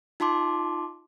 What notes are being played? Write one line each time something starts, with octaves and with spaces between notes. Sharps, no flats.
D#4 F4 A5 C6 D6